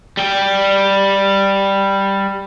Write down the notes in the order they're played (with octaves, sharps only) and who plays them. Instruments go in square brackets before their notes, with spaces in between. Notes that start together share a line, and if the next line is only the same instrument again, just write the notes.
[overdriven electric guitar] G3 G5